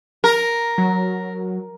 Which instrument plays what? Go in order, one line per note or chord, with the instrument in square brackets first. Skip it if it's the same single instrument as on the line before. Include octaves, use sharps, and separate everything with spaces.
[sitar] A#4
[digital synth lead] F#3